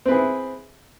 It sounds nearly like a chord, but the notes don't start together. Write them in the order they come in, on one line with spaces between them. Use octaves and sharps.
C4 B4 G#4 E4